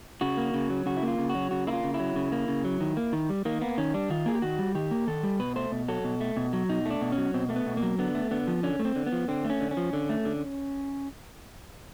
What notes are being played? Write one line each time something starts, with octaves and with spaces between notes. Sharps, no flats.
C#3 F#4
A#3
C#3
F#3
C#3 F#4
E4
A#3 F4
C#3
F#4
F#3
C#3 F#4
A#3 E4
F4
C#3
E4
F#3
C#3
A#3
C#3
F#3
D#3
A#3
D#3
G3
D#3 A#3
A#3 B3
D#3 C#4
G3 D4
D#3 F4
A#3 G#4
G4
D#3 F#4
G3
D#3 G4
A#3
D#3 A4
G3
B2 B4
A3 C5
B2
F#3 A4
B2
A3
B2
F#3
B2 D#4
A3
D4
B2
C#4
F#3
B2 C4
A3 A#3
B3
B2
A#3
F#3
D3 B3
A3
D3 B3
F3
D3 C#4
A3
C4
D3
B3
F3
D3 C4
A3
C#4
D3
C#4
F3
D3
A3
D3